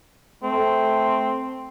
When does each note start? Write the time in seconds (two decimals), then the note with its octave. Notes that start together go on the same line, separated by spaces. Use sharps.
0.43 A3 C4